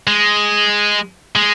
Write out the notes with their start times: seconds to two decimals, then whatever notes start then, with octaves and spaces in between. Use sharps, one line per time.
0.07 G#3
1.36 G#3